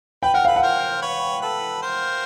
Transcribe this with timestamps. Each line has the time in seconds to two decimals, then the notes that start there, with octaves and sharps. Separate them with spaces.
0.23 B4 G5
0.34 A#4 F#5
0.45 A4 B4 F5
0.56 F#5
0.63 A#4 C5
1.02 B4 C#5
1.42 A4 B4
1.82 A#4 C5